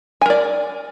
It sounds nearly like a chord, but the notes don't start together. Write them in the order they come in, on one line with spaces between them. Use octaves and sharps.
G#5 A#4 D5